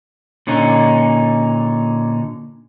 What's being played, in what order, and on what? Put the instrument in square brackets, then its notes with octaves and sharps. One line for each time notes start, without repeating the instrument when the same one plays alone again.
[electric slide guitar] A#2 D3 C#4 D#4